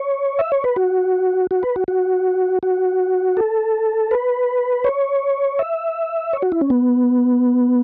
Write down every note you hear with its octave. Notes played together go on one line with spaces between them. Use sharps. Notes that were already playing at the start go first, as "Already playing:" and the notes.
Already playing: C#5
E5
C#5
B4
F#4
F#4
B4
F#4
F#4
F#4
A4
B4
C#5
E5
C#5
F#4
E4
C#4
B3